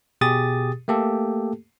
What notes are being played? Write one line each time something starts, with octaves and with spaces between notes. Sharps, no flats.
B2 G4 G#4 D#6 A6
A3 A#3 G4 A4